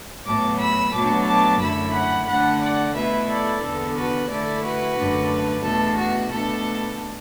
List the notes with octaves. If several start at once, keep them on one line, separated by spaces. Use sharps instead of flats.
A2 F#3 B3 A5 D6
B5 E6
B2 F#3 A3 D4 A5 D6
A5 D6
F#2 D3 A3 E4 B5 E6
F#5 B5
D3 A3 D4 F#5 B5
D5 F#5
B2 A3 E4 B4 E5
A4 D5
E2 D3 B3 D4 A4
F#4 B4
D3 A3 E4 A4 D5
F#4 B4
F#2 D3 A3 D4
E2 B2 A3 D4 A4
F#4
B2 A3 D4 A4